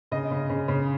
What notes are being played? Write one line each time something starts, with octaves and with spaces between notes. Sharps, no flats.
C#3 D#5
C#3
C#3
C#3